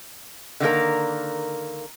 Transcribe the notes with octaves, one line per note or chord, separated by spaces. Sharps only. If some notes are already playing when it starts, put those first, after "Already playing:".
D3 D#3 A#3 A#4